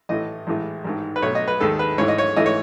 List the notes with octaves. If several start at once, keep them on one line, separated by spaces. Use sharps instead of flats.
A1 A2 E3 A3 D#5
A1 A2 E3 G#3
A1 G#2 D#3
B4
B1 B2 A3 C#5
D#5
B4
D#2 D#3 G#3 A4
B4
G#2 E3 A3 C#5
D#5
C#5
G#2 E3 A3 D#5
C#5